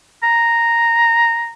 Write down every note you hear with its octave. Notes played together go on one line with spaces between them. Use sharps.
A#5